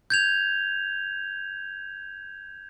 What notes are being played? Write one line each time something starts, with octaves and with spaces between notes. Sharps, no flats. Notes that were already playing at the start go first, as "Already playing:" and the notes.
G6 G#6 F7